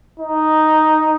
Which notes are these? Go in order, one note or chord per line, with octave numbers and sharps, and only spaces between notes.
D#4